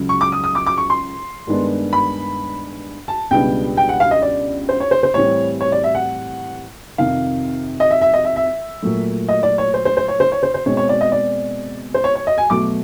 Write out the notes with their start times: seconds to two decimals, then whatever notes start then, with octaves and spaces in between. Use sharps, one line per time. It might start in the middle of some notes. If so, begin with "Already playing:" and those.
Already playing: C#2 C#3 F#3
0.09 C#6
0.21 D6
0.32 D#6
0.44 D#6
0.55 D6
0.66 D6
0.78 C#6
0.90 C6
1.47 G2 D#3 G#3 B3 D4
1.93 B5
3.08 A5
3.31 C#2 B2 G3 B3 D4 G5
3.77 G5
3.89 F#5
4.00 F5
4.11 D#5
4.22 D5
4.69 C5
4.80 C#5
4.91 C5
5.03 C5
5.14 A2 E3 G3 C4 C#5
5.61 C#5
5.72 D5
5.84 E5
5.95 F#5
6.98 F2 C3 D#3 F5
7.80 D#5
7.91 E5
8.01 E5
8.14 D#5
8.25 E5
8.36 E5
8.82 A#2 F#3 A3
9.28 D#5
9.43 D5
9.58 C#5
9.74 C5
9.85 C5
9.97 C5
10.08 C#5
10.20 C5
10.32 C#5
10.43 C5
10.54 C5
10.66 B2 G#3 C4 C#5
10.77 C#5
10.89 D5
11.01 D#5
11.12 D5
11.94 C5
12.04 C#5
12.15 C#5
12.27 D#5
12.38 G#5
12.50 B2 F#3 A3 D6